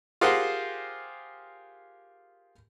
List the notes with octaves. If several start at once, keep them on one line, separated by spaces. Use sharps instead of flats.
F4 G4 G#4 A#4 C5 F#5